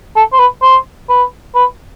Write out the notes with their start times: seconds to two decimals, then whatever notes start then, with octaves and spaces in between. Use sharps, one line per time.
0.16 A4
0.33 C5
0.39 B4
0.62 C5
1.09 B4
1.55 B4